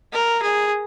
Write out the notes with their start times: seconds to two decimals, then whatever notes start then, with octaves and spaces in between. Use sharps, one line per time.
0.13 A#4
0.43 G#4